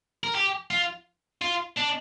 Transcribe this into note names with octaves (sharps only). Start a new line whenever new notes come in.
A#4
G4
F4
F4
D4